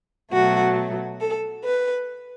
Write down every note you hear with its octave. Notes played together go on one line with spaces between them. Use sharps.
B2 F#3 A3 F#4
A4
B4